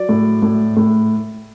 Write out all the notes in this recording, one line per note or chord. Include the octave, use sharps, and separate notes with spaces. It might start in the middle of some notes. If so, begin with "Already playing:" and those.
Already playing: F#3 D5
A2
A2
A2